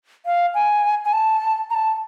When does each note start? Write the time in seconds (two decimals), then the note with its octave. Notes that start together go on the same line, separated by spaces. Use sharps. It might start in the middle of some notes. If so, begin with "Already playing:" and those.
0.26 F5
0.54 G#5
1.05 G#5
1.13 A5
1.70 A#5
1.74 A5